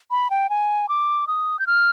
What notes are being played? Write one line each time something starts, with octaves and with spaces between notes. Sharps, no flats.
B5
G5
G#5
D6
D#6
G6
F6